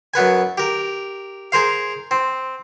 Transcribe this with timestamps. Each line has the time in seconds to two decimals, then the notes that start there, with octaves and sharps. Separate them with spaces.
0.14 F#2 B3 B4 G#5
0.58 G4 A#4
1.52 G#4 A#4 C5 F5
2.11 C4